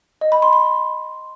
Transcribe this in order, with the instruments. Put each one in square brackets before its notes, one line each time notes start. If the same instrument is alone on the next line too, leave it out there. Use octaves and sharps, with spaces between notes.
[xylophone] D#5
B5
C6
C6